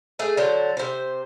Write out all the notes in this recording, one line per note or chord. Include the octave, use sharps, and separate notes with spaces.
A3 G#4
D3 F#3 C5
C3 C5